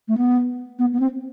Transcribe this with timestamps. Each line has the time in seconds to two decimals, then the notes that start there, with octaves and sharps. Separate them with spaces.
0.08 A3
0.17 B3
0.79 B3
0.93 B3
1.00 C4